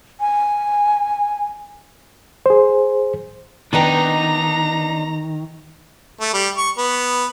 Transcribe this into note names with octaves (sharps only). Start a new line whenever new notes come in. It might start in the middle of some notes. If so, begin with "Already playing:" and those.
G#5
G#4 C5
D#3 B3 D4 D#4 B4 G5 A#5
A3
G3
C#6
B3